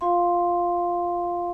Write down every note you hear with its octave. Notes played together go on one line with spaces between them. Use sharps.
F4 F5 C6